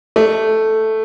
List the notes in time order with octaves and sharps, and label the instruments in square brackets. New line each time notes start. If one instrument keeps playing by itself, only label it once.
[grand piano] A3